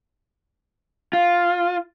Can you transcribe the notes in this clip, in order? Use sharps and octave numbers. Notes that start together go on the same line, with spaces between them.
F4